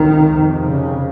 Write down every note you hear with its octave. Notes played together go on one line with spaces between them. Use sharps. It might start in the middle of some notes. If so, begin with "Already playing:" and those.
Already playing: C#2 C3 D#3
F2 C3
C#3